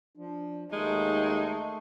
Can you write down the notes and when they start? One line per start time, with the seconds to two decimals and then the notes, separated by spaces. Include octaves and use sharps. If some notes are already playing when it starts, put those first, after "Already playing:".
0.17 F3 D4
0.72 D#2 G#3 A3 D#4